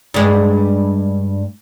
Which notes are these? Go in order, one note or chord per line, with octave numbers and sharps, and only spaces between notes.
G2 G#3